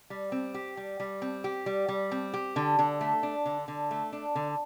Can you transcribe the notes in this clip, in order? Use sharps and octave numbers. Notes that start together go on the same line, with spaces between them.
G3
C4
G4
G3
G3
C4
G4
G3
G3
C4
G4
D3
D3
A3
D4
D3
D3
A3
D4
D3